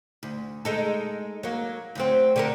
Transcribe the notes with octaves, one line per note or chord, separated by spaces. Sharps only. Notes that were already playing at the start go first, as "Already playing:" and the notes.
D2
G#3 D#4 A4
F#3 A#3
D2 F#3 C4
D3 A3 A#4